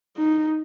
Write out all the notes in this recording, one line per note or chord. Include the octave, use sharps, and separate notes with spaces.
D#4